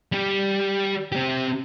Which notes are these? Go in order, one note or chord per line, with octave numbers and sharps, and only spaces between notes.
G3 G4
C4 G4